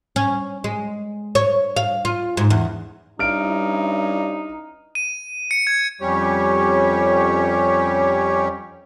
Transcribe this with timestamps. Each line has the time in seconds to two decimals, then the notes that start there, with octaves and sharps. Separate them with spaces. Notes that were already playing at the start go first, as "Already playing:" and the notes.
0.16 C#4
0.64 G#3
1.35 C#5
1.77 F5
2.05 F4
2.37 G#2
2.50 E2
3.19 G2 G3 C#4 D#4 E4 F6 D7
4.95 D#7
5.51 C#7
5.67 G#6
6.01 F2 G3 C#4 G4 C#5